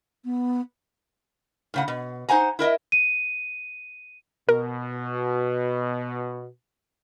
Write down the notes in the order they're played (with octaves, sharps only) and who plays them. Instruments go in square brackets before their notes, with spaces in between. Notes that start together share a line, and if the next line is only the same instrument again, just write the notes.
[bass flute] B3
[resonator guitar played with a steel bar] A2 C#3 F#5
B2
D#4 C5 F#5 G#5 A#5
E4 A#4 D#5 E5
[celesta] D#7
[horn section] B2 [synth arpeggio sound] A#4